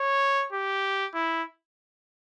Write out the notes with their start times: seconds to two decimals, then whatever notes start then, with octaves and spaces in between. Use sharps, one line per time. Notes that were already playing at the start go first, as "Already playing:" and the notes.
Already playing: C#5
0.52 G4
1.15 E4